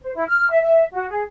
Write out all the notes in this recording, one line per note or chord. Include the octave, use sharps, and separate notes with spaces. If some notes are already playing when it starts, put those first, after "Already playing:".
C5
E4
F6
E5
E5
F#4
G#4